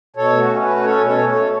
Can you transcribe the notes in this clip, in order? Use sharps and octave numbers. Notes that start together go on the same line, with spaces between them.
B2 A4 C#5
A3
F#4
C#4
A3 F#4 B4
C#4 A4 C#5
B2
A4 C#5
A3
A4 C#5
A3